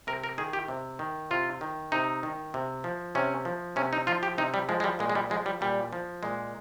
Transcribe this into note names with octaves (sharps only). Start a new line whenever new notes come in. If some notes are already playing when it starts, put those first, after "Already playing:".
C3 A#4
A#4
D#3 G#4
G4
C3
D#3
C3 F4
D#3
C3 D#4
D#3
C3
F3
C3 C#4
F3
C3 C#4
D#4
F3 F4
G4
C3 D#4
G3
F3 G#3
G#3
G3
A#2 G#3
G#3
G3
F3 G#3
G3
A#2 G3
F3
A#2 G#3